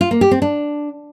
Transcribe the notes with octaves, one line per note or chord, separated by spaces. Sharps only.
F4
A#3
G4
C4
D4